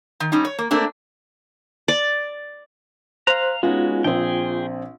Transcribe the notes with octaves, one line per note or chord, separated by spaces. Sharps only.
D#3
G3 C#4 D#4
C#5
A#3
A3 A#3 C4 D4
D5
C5 F5 A#5 F#6
G#3 B3 C#4 D#4 F4 F#4
A#1 C4 G#4 G5